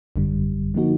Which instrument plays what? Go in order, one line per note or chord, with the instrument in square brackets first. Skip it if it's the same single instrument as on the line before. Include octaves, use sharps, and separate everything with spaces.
[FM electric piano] G#1 F#2 D3 G3
D3 F3 A#3 D#4 F#4